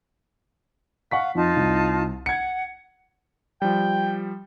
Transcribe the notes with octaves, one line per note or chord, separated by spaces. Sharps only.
F5 F#5 C#6 B6
F2 D#4 F4 A5
C2
F#5 G#6 C#7
F3 G3 G5